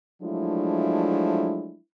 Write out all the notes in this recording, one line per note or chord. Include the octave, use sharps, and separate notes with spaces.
F3 F#3 G#3 A3 D4 E4